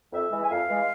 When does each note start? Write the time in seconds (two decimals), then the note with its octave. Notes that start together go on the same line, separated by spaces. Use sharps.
0.13 F2 E5
0.32 E3 G#3
0.44 G#5
0.50 F2 F5
0.69 E3 G#3